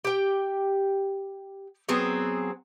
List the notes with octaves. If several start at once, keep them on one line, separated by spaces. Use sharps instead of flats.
G4 G5
F#3 B3 C4 G#4